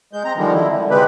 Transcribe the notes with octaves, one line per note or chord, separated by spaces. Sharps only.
G#3 G6
C4 A#5
D3 D#3 F3 G3 G#3
E4
D3
C3 G#3 C4 G4 B4